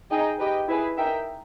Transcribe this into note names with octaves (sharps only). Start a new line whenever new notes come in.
D#4 G#4 D#5 G5
G4 B4 D#5 G5
E4 G#4 B4
D#4 A#4 E5 G5